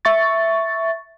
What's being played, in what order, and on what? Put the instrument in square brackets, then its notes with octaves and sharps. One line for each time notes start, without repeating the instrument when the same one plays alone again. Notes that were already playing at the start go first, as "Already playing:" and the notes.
[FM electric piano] E5 C#6 A6